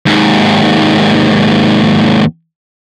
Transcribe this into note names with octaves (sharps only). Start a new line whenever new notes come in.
D#2 G#2